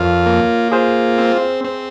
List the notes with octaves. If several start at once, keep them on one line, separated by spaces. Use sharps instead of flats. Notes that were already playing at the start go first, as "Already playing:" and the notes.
Already playing: F2 F4 A#4 C#5
A#3
F4 G#4 C5
C4
C4